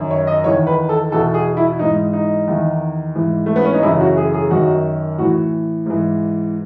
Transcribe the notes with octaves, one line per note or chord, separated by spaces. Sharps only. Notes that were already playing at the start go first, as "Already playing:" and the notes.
Already playing: F#2 D#3
C#5
D#5
E2 D#3 C#5
B4
A4
E2 B2 A4
G#4
E4
G#2 E3 D#4
D#4
E2 D#3
G#2 E3
A3
B3
C#4
D#4
F#2 C#3 E3 E4
F#4
G#4
G#4
F#2 D#3 F#4
A2 E3 F#4
G#2 E3